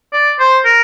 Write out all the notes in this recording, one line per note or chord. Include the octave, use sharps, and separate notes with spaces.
D5
C5
A#4